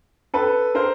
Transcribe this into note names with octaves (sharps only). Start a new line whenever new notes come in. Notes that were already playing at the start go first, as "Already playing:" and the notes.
A4 B4
A#4 C5